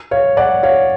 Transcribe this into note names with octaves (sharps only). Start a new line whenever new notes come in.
C#5 F5
D5 F#5
C#5 F5